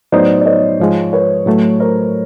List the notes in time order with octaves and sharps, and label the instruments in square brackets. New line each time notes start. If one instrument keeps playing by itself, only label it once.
[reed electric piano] A2 F#3 B3 D#4 [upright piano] C5 D5
[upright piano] D5
C#5 D#5
[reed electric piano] G#2 F3 G#3
[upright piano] B4 C#5
[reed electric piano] A2 F#3 A3
[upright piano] A#4 C5